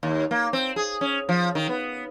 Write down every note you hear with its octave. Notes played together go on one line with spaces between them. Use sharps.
D#2
A#3
C4
G#4
C#4
F3
D#3
B3